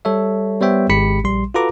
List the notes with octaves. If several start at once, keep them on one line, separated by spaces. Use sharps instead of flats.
G3 A4 C#5 E5
G3 B3 C5 C#5 E5 G5
G#1 G#3 G4 B5 B6 C#7
A#1 G3 C6
F4 F#4 A4 B4 A#5 D6